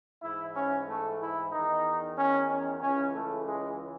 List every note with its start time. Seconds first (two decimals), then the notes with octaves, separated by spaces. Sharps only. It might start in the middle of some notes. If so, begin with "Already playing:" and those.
0.23 G#2 E3 E4
0.55 C#4
0.89 A3
1.20 E4
1.52 E2 D#3 D#4
2.18 C#4
2.50 C#4
2.82 C#2 C#3 E3 C#4
3.14 A3
3.46 G#3